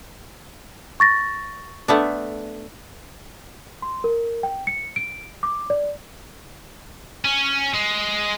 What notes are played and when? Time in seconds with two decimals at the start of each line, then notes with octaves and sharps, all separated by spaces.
1.00 C#6 A6 A#6
1.88 A3 B3 D4
3.82 C6
4.04 A#4
4.43 G5
4.67 C#7
4.96 D7
5.43 D6
5.70 D5
7.25 C#4
7.74 G#3